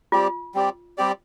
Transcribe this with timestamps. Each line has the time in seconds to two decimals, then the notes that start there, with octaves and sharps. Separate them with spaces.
0.12 G3 C4 F4 G4 D5
0.54 G3 C4 G4 D5
0.98 G3 C4 G4 D5